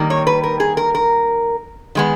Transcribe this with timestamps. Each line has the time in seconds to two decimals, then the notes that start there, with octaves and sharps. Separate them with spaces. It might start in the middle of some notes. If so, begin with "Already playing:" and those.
Already playing: D#3 G3 A#3
0.10 C#5
0.27 B4
0.44 A#4
0.60 G#4
0.77 A#4
0.95 A#4
1.95 D#3 G#3 B3